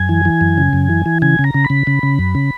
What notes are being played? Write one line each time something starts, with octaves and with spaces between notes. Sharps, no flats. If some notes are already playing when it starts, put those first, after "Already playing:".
Already playing: F#2 G#5
E3
E3
F#2
C#3
F#2
E3
E3
C#3 G#5
C#3
A#5
C#3
B5
C#3
C#3
C#3
F#2
C#3